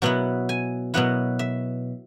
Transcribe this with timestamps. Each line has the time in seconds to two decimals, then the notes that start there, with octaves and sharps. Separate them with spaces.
0.02 B2 F#3 B3 E4 F#5
0.49 G#5
0.94 B2 F#3 B3 E4 F#5
1.39 E5